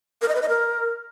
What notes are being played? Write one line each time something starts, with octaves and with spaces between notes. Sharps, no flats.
A#4
D#5
B4
D#5
A#4